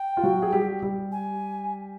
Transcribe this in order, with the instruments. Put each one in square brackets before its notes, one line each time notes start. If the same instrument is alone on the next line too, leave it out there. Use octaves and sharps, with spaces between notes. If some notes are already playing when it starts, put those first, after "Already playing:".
Already playing: [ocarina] G5
[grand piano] F4
F#3 F#4
G#4
G3 G4
G3 G4
[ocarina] G#5